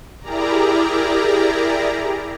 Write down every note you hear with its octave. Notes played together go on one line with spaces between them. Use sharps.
E4 G4 G#4 A#4 D5 A#5